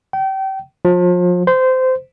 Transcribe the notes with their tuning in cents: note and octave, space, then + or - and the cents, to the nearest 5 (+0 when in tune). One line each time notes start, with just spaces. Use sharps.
G5 -30
F3 +35
C5 -20